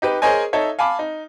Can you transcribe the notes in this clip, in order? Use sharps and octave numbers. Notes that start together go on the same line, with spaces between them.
D#4 G4 B4
G#4 A#4 C5 C#5 D#5 G#5
D#4 A4 C#5 E5
F5 G#5 A5 B5 D6
D#4